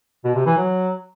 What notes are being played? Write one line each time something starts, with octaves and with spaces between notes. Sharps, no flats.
B2
C3
E3
F#3